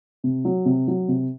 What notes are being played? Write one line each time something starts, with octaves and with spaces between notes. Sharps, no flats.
C3
F#3
C3
F#3
C3